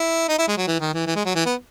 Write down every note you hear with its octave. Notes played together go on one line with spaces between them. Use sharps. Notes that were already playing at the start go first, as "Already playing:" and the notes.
Already playing: E4
D#4
E4
G#3
F#3
E3
D#3
E3
E3
G#3
F#3
E3
B3